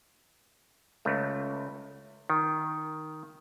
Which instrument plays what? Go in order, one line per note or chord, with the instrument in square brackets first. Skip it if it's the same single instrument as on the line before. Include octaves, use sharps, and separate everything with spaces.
[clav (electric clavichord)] C#2 A3
D#3